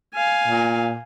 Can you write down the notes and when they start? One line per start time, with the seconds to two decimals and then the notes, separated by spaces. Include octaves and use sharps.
0.15 F5 G#5
0.48 A#2